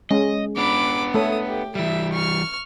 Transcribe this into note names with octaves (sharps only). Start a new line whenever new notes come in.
G#3 C#4 D#5
B3 D4 B5 D6
A3 A4 C#5 D#6
G4
E3 G3 E5
C#6 F6